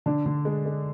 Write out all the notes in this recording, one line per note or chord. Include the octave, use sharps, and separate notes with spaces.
D3 D4
D3
G#3
G#3